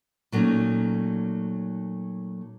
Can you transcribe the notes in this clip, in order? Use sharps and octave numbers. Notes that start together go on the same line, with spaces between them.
A#2 F#3 A3 C#4 D#4